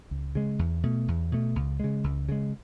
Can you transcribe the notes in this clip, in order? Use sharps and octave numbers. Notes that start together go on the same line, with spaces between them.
C#2
C#3 G#3
E2
B2 A3
E2
B2 A3
C#2
C#3 G#3
C#2
C#3 G#3